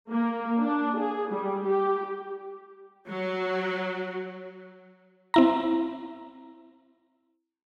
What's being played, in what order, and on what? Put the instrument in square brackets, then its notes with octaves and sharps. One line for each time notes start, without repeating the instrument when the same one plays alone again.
[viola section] A#3
D4
G#4
G3
G4
F#3
[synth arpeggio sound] C4 E4 A#5